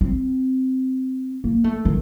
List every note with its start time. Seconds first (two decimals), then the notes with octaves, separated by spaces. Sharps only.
0.01 C4
1.44 A#3
1.64 A3
1.85 D#3